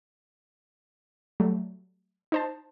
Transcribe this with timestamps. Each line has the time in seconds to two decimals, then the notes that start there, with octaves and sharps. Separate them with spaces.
1.40 F#3 G3 A3
2.32 D#4 C5 A5